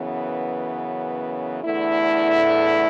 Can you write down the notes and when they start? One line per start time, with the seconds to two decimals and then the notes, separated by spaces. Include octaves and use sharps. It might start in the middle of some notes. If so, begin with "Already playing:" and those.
Already playing: F#2 C#3 E3 B3
1.63 E2 D3 A3 E4